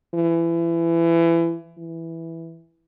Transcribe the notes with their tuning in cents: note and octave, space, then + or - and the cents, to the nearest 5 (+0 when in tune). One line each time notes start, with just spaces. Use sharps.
E3 +25
E3 +0